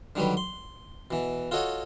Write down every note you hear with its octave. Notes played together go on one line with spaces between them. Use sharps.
D3 D#3 F#3 G3 B4
C6
B2 E3
F4 F#4 A4 C#5 D#5 F#5